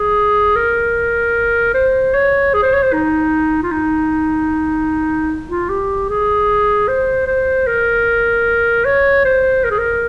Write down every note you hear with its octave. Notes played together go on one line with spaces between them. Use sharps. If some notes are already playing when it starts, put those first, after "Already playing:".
Already playing: G#4
A#4
C5
C#5
G#4
C5
C#5
C5
D#4
F4
D#4
F4
G4
G#4
C5
C5
A#4
C#5
C5
A#4
G#4
A#4